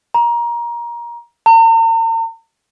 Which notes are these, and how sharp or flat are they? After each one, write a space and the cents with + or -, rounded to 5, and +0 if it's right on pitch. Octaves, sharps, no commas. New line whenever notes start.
A#5 +20
A#5 -45